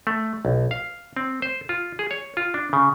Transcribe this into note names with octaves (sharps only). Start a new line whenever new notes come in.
A3
B1
F5
C4
C5
F4
G#4
C#5
F4
D4
C#3